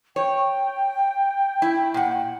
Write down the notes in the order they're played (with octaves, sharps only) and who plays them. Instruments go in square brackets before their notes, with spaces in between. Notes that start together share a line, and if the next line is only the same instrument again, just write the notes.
[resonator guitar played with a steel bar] C#5 [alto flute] G5
[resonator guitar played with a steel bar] E4
A#2 F#5